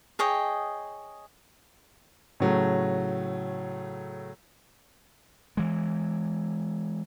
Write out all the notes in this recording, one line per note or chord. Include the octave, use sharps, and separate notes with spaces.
G#4 C#5 D#5 G5
A2 C#3 F#3 A3
E3 G#3